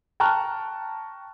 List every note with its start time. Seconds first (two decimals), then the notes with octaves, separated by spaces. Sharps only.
0.20 G5 A5 A#5 C#6 F6 F#6